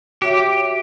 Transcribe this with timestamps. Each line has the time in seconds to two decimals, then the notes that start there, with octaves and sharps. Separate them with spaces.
0.22 F#4 G4 C#5 E5